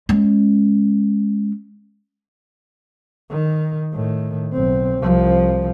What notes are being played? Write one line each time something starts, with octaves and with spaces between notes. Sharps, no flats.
G#3 C#4
D#3
A2 D#3
B1 C4
C2 F3